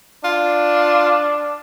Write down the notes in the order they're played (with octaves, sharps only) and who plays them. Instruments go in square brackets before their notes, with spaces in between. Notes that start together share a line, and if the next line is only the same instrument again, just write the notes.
[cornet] D4 [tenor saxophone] F4